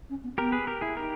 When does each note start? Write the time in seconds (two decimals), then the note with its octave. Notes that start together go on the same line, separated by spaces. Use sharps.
0.09 C#4
0.23 B3
0.38 B3 G4 A#4
0.52 G#4 B4
0.67 G4 A#4
0.81 E4 G#4
0.96 D#4 G4 A#4